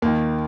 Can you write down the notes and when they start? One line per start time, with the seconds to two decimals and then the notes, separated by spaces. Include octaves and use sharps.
0.02 D#2 D#3 A#3